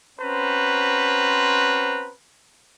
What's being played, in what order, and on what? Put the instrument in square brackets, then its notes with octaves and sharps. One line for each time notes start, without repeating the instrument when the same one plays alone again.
[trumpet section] C4 C#4 F#4 B4 C5 A#5